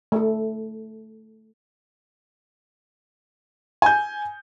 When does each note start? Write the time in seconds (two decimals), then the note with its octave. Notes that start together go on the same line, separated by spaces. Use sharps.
0.12 A3 A4
3.82 G#5 G6